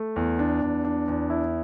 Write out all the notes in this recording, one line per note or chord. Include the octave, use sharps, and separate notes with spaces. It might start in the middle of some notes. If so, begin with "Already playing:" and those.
Already playing: A3
E2
D4
E2
D4
E2
E4